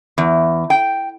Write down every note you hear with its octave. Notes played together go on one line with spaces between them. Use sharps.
E2
G5